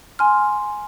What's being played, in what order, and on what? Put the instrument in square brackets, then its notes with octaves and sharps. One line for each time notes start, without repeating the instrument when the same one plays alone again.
[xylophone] G#5 C6 F6